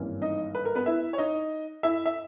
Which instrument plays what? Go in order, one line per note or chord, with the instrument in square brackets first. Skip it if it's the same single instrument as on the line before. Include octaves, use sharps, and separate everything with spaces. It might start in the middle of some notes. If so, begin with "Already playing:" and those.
Already playing: [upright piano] G#1 G2 E3 A#3 C#4
D#4 D#5
B4
A#4
B3 B4
E4 E5
C#5
D#4 D#5
E4 E5
E5